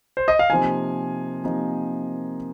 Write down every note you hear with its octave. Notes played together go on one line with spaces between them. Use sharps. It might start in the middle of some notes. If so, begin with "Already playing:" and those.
C5
D#5
F5
C3 F3 A#3 D#4 G#5
C3 F3 A#3 D#4